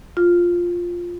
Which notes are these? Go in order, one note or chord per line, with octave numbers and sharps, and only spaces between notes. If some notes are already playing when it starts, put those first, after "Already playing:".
F4